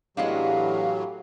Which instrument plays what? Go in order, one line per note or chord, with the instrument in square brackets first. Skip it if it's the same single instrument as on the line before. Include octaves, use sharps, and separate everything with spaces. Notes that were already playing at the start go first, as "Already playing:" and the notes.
[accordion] A2 E3 F#3 [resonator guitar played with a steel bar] G#3 B3 D4 [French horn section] G4 [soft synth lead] F5